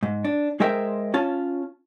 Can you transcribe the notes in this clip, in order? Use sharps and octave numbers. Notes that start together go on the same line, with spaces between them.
G#2
D4
G#3 G#4 A#4 C5 E5 G5
C#4 F4 A5